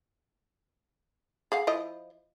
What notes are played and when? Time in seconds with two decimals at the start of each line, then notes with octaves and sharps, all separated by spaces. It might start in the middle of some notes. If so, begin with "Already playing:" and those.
1.52 G#4 F5 F#5
1.67 F3 E4 D#5